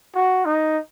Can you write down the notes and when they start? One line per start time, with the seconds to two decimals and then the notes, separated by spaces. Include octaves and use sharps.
0.15 F#4
0.45 D#4